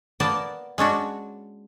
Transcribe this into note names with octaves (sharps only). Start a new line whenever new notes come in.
A#3 B3 A#4 D5 A5
G#3 C#4 D4 F#4